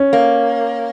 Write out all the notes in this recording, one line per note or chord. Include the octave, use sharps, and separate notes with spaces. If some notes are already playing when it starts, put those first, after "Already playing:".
Already playing: C#4
A#3